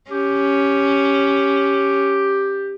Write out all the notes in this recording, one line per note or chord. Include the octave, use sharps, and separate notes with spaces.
C#4 G4